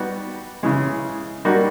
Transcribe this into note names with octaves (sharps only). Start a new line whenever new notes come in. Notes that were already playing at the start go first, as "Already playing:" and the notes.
Already playing: G3 B3 D#4 F#4
C#3 E3 G#3
G3 A#3 D#4 F#4 A#4